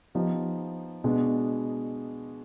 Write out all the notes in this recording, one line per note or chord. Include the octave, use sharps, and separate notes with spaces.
F3 B3 D#4 G4
B2 G#3 B3 D4